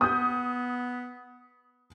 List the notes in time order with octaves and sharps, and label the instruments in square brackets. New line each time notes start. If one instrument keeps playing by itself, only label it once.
[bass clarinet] B3 [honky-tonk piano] D#6 G6